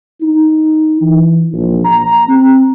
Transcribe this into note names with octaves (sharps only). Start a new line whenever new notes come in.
D#4
E3
A#1
A#5
C4